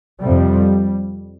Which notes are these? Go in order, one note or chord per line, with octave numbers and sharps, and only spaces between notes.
F2 C3 G3